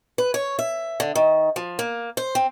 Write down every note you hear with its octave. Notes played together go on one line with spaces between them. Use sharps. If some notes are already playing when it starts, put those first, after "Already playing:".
B4
C#5
E5
D3
D#3
F3
A#3
C5
C4